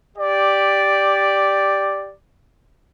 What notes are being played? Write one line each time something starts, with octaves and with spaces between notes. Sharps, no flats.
G4 D5